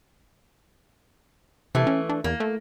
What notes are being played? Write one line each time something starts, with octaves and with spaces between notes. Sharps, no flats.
C3 E3 A3
C#4
D4
E2 A#3
A3